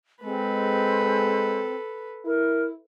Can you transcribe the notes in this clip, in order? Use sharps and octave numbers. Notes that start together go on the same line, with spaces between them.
G#3 C4 A4 B4
E4 A#4